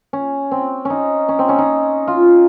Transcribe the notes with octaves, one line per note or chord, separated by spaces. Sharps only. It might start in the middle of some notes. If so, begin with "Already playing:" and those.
C#4
C4
C#4 D#4
C#4
C4
C#4
D#4
F4